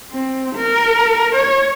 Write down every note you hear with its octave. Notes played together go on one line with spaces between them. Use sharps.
C4
A#4
C#5